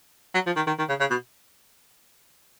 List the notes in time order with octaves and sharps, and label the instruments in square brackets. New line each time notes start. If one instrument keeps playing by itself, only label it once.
[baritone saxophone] F#3
F3
D#3
D#3
D#3
C#3
C#3
B2